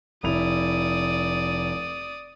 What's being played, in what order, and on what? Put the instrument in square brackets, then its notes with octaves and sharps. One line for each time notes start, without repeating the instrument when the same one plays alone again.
[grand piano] F1 E4 F7 [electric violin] D5 D#6